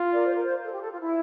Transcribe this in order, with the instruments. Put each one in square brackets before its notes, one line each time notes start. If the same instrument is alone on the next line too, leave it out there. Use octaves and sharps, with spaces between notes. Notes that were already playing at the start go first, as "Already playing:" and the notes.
Already playing: [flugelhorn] F4
[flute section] A#4 D5
C5
A#4
C5
A4
G4
A4
F4
E4